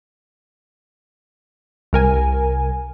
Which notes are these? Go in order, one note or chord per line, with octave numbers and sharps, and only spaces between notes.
C2 A#4 G#5